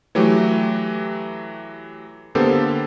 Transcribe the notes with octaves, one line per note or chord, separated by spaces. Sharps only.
E3 F#3 A3 G4
D3 A#3 B3 G4 A4 C5